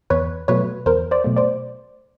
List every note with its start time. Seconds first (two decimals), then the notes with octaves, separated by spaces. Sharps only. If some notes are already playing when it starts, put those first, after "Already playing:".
0.10 E2 B4 C#5
0.48 B2 F#3 A3 B4 C#5
0.86 E2 A#4 C5
1.11 C5 D5
1.24 B2 F#3 A3
1.36 C5 D5